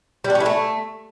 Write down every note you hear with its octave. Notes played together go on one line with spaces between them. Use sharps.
G3
D4
C#4
E4
A3